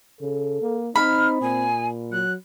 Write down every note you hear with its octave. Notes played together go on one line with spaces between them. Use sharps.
C#3 A4
A#3
C4 D#4 B5 F6
A#2 G#5
F#3 F#6